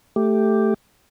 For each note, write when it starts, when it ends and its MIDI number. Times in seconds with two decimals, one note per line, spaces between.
0.16 0.74 57
0.16 0.74 67